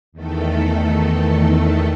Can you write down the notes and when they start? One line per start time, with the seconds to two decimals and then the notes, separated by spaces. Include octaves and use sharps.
0.12 E2 D#3 A3 A4